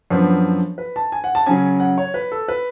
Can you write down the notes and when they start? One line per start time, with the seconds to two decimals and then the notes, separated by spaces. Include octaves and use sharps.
0.10 F#2 F3 B3 D4
0.78 B4
0.96 A5
1.12 G#5
1.24 F#5
1.35 A5
1.46 C#3 F#3 C#4 G#5
1.80 F#5
1.98 C#5
2.14 B4
2.32 A4
2.48 B4